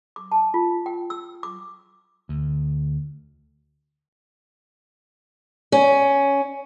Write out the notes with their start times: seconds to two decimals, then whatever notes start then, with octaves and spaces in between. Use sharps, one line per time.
0.16 D6
0.32 A5
0.54 F4
0.86 G5
1.10 E6
1.43 D6
2.29 D2
5.72 C#4